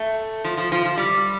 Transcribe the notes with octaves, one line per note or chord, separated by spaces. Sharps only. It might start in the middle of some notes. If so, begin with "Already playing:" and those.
Already playing: A3
F3
F3
F3
F3
G3